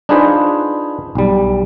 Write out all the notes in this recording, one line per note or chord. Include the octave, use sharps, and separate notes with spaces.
D4 D#4 F4 G#4 B4 C5
B1 G3